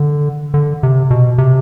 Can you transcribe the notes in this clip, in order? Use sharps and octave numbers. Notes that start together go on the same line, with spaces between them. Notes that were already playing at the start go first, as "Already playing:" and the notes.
Already playing: D3
D3
C3
B2
C3